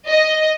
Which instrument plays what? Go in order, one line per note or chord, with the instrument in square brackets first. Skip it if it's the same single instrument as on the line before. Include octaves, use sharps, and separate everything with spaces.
[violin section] D#5